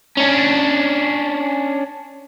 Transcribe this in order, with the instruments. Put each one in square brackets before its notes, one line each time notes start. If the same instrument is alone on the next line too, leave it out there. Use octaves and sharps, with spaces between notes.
[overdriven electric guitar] C#4 D4